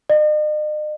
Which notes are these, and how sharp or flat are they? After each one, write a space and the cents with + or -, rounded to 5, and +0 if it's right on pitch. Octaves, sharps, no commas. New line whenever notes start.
D#5 -45